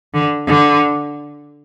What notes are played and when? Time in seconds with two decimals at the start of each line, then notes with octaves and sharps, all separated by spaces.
0.14 D3
0.47 D3